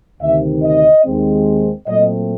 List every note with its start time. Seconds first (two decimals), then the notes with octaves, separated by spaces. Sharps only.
0.20 D2 C3 D#3 E5
0.62 D#5
1.04 D#2 D#3 G#3 C4
1.87 A#2 F#3 A3 C4 D#5